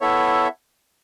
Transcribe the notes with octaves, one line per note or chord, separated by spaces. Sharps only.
B3 E4 A4 C#5 E5